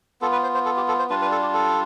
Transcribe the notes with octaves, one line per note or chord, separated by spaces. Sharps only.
B3 F4 A4
B4
C5
C5
A4
G4
A4
C5
G3 D4 F4 B4
B4
A4
G4
A4